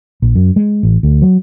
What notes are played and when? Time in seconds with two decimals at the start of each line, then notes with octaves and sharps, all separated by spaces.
0.22 A#1
0.35 F#2
0.56 G#3
0.83 A1
1.03 D2
1.22 F#3